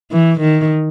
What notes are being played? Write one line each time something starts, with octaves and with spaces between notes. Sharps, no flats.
E3
D#3